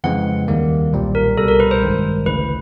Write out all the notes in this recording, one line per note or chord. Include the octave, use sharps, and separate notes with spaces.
F2 C#3 E3 G#3 C4 F#5
D#2 D#3 G3 A#3
B1 A#2 G3 C4
A#4
C2 B2 G3 A4
A#4
B4
C5
A1 G2 D#3 G#3
D2 C#3 E3 B4